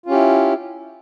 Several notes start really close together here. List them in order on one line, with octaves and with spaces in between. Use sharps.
F4 C#4 G4 E4